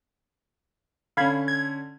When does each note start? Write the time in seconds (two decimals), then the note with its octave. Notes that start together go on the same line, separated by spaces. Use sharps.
1.17 D3 C#4 F5 B5 G#6
1.48 G#6